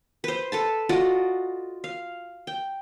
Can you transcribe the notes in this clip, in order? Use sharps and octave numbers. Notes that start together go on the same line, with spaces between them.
B4 C5
A4 B4 A5
F4 F#4 D5 D#5
F5
G5